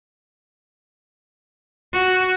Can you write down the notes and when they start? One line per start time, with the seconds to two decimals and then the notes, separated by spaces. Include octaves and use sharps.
1.93 F#4